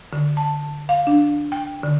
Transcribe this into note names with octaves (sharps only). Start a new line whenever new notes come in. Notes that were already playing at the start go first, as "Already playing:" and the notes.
D3
A5
F5
D4
G5
D3